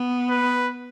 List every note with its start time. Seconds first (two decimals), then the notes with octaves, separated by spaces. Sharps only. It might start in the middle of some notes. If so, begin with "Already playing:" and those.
Already playing: B3
0.30 B4